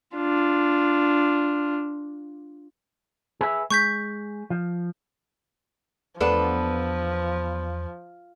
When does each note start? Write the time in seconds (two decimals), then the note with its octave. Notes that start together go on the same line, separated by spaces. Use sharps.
0.16 D4 F4
3.41 G#4 B4 E5
3.70 G#3 C#6 G6 B6
4.50 F3
6.21 E2 F3 B3 D4 A4 B4